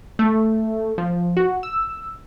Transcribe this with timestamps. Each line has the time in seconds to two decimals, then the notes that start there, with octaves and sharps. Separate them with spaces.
0.19 A3
0.98 F3
1.37 F#4
1.63 E6